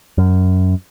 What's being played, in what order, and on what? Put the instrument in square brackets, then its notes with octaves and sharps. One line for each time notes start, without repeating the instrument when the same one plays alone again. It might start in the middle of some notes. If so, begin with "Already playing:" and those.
[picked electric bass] F#2